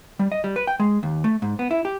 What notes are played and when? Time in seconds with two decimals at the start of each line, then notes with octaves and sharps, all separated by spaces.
0.19 G3
0.32 D#5
0.44 G3
0.56 B4
0.67 G5
0.80 G#3
1.03 D#2
1.24 A3
1.42 G#2
1.59 B3
1.71 E4
1.85 G4